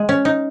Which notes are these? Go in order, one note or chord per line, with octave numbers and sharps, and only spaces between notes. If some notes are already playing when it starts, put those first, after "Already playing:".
Already playing: G#3
C#4
D#4